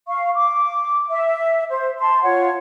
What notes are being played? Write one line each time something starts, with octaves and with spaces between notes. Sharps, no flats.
F5 C#6
D6
E5
C5
A5 C6
F4 C#5 F#5